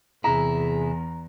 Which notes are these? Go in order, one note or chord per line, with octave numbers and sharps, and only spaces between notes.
E2 C3 E4 G#4 A#5